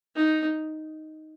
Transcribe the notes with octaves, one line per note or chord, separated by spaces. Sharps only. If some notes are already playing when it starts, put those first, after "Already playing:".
D#4